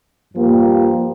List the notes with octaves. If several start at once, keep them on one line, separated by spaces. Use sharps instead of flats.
G2 F3 A#3 G4